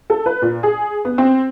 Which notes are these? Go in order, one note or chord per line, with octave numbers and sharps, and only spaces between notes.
A4
B4
A#2
G#4
B3
C4